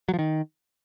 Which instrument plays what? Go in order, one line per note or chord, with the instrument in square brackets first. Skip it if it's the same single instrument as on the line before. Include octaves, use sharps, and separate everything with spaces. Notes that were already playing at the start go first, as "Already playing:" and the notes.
[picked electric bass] F#3
F3
D#3